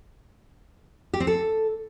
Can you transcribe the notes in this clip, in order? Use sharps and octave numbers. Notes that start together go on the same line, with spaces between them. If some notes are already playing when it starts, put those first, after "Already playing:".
G4
C4
A4